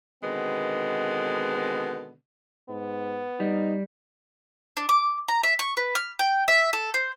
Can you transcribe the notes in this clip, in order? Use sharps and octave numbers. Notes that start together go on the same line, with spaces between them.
B2 D3 D#3 G#3 B3 C4
G#2 B3
G3 D#4
D4
D6
A#5
E5
C#6
B4
F6
G5
E5
A4
C5